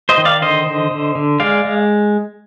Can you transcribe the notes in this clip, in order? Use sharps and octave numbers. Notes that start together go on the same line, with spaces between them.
C5 D#5
D#3
D5 F5
D3 C5 D#5
D3
D3
D3
G#3 D5 F5
G#3